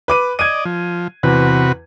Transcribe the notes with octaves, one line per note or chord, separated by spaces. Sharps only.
B4 D6 D#7
D5 D#5 G#6 D#7
F3
E2 C3 F#4 B4